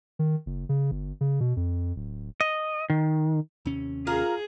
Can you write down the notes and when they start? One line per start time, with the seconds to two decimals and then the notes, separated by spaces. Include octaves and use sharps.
0.19 D#3
0.46 F#1
0.69 C#3
0.91 G1
1.21 C#3
1.40 B2
1.56 F2
1.96 D1
2.41 D#5
2.90 D#3
3.66 D#2 C3 C#4
4.07 F4 G#4 A#4